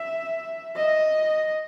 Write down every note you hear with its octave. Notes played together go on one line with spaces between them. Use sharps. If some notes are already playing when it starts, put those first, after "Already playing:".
Already playing: E5
D#5